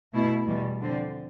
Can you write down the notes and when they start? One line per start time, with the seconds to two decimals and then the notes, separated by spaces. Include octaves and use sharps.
0.13 B2 A3 E4
0.47 E2 B2 G3
0.80 D3 F3 C4